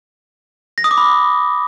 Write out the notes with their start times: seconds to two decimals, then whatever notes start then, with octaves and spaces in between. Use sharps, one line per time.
0.78 A#6
0.84 D#6
0.91 D6
0.98 B5